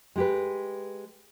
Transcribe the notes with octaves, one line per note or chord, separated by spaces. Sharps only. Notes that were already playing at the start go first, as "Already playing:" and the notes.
G#3 G4 B4